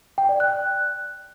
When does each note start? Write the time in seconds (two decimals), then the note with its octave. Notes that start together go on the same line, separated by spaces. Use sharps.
0.18 G5
0.29 D5
0.40 F#6